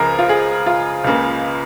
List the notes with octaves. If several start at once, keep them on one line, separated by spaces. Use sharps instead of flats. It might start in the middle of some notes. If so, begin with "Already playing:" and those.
Already playing: C#2 C#3 F3 G#4 A#4
F4
G#4
F4
C#2 C#3 A#3